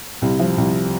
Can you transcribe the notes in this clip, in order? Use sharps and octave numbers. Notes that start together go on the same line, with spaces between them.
C2
F3
C2